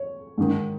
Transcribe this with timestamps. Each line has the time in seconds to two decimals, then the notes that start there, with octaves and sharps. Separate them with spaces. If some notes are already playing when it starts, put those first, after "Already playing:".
Already playing: C#5
0.38 G#2 D#3